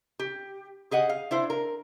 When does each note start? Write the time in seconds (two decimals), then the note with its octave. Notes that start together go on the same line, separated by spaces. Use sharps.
0.19 G4
0.91 G4 G#4 D#5 F#5
1.09 F5
1.31 D4 E4 C5
1.50 A#4